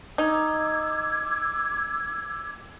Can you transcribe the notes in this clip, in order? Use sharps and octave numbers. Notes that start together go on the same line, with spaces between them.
D#4 D6 E6 G#6